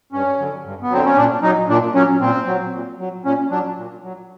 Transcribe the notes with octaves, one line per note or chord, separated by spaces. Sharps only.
G2 C#4
D3 F#3
G2
B3
D3 F#3 C4
C#4
A#2 D4
F#3 D#4
A#2 D4
F#3 C#4
A#2 C4
F#3
A#2
F#3
A#2 C#4
F#3 D4
A#2
F#3